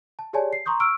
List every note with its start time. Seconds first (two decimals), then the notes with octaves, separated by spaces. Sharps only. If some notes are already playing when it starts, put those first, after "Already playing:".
0.19 A5
0.33 G4 G#4 C#5 D5 G#5 A5
0.53 C7
0.66 A#5 C6 C#6 D#6 G6
0.80 C#6 E6 F6 D7